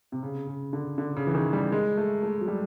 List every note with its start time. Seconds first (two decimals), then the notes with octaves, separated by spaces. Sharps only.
0.12 C3
0.23 C#3
0.47 C#3
0.73 D3
0.98 D3
1.16 C#3
1.27 E3
1.35 D#3
1.53 G3
1.72 G#3
1.97 A3
2.23 A3
2.41 F#3
2.48 G3